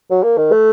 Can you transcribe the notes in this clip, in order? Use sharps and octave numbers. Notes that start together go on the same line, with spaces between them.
F#3
A#3
D#3
A3